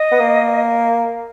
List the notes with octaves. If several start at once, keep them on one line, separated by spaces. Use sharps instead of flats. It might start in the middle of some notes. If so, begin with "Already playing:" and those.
Already playing: D#5
B3
A#3